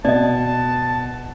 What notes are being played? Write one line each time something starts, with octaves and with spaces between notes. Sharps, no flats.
B2 D5 D#5 A5